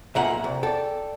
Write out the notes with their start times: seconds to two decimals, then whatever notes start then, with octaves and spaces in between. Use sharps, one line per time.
0.15 B1 A#2 E5 F#5 G#5
0.44 C2
0.63 A4 D5 G5